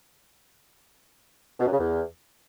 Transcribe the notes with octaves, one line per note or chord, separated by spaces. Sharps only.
B2
F#2
C#3
E2